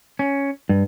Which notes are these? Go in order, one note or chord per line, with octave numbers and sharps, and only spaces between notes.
C#4
G2